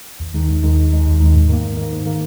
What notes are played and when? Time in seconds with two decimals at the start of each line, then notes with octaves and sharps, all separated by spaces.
0.20 D#2
0.34 D#3 G#3 D#4
0.48 D#2
0.63 D#3 G#3 D#4
0.77 D#2
0.91 D#3 G#3 D#4
1.05 D#2
1.20 D#3 G#3 D#4
1.34 G#2
1.49 D#3 A#3
1.63 G#2
1.77 D#3 A#3
1.91 G#2
2.06 D#3 A#3